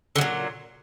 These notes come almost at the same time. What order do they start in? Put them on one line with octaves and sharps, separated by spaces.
D3 F#3 A#2